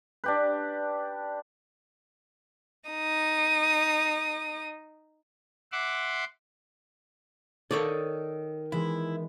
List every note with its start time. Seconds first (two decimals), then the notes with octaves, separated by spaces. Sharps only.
0.24 D4 G4 B4
2.90 D#4 D#6
5.72 E5 F#5 C6 D6
7.71 D#3 A4 C#5 D5 D#6
8.72 E3 G#3 B3 E4